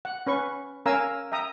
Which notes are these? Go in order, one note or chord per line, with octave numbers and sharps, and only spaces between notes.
F#5
C#4 B4 C#6
C#4 A#4 F5 G#5 A#5 E6
E5 G5 A#5 D#6